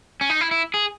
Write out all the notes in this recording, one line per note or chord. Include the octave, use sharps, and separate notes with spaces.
C#4
D#4
E4
E4
G#4